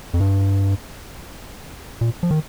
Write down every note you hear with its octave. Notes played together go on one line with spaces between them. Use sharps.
F2
G2
A#2
F3
D#3